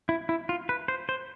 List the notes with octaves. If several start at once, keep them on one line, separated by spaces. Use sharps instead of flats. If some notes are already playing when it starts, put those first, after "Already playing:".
E4
E4
F4
B4
C5
C5